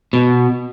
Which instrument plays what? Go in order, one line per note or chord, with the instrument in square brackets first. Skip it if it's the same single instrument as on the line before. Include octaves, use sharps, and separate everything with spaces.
[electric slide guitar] B2